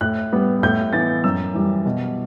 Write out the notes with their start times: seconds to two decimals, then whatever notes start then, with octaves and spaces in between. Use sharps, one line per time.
0.01 A2 F#6
0.32 G3 B3
0.63 A2 G6
0.93 E3 B3 A6
1.24 F#2 E6
1.54 E3 G3
1.86 B2